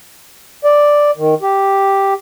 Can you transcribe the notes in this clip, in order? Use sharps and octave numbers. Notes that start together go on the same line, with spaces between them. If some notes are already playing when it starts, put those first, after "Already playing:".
D5
D#3
G4